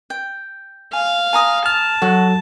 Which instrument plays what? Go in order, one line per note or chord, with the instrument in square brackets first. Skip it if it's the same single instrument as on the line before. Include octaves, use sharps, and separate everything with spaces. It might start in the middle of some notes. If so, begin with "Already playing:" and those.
[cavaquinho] G5
[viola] F5 [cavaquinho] G#5
[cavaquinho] G#5 A#5 D#6
[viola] A5 [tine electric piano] F6
[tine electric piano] F#3 A4 [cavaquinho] F#4